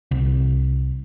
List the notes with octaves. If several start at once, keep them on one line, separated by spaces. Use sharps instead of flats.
C2